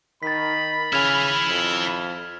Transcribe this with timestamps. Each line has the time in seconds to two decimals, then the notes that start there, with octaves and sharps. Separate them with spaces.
0.23 D#3 B5 A6 B6
0.93 C#3 E4 G#5 F6 G#6 F7
1.48 F2